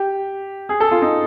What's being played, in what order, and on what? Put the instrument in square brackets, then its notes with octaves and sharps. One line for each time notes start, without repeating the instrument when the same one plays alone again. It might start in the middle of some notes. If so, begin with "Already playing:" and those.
Already playing: [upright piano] G4
G#4
A4
F4
D#4